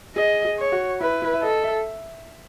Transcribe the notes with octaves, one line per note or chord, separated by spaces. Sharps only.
G#4 D#5
G#4
C#5
F#4
E4 B4
E4
E5
A4 D#5
E5